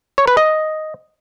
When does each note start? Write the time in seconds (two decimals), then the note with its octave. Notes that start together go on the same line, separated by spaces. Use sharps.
0.18 C#5
0.27 B4
0.37 D#5